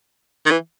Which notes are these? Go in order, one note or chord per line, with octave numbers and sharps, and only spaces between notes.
D#3
E3